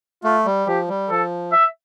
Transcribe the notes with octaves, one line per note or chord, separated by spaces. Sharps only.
A3 F4
G3
F3 G4
G3
F3 A4
E5